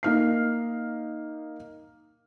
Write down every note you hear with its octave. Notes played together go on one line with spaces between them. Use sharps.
A#3 D#4 F6 C7